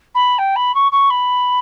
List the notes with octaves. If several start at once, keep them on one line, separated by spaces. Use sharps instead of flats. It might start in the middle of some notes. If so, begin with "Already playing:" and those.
B5
G5
B5
C#6
C#6
B5